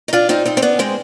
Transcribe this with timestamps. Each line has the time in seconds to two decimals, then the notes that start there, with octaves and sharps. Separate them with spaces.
0.08 D#4
0.13 D4 F4
0.29 C4 D#4
0.46 C4 D#4
0.57 C4
0.62 B3 D4
0.79 G#3 C4